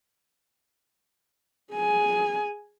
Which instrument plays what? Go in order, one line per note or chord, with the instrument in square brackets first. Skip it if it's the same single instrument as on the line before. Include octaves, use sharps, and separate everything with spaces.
[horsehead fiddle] G#4 G#5